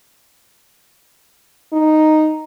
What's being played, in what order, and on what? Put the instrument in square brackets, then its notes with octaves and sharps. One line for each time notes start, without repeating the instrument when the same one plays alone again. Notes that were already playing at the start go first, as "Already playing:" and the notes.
[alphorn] D#4